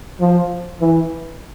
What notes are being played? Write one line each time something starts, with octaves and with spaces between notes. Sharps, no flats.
F3
E3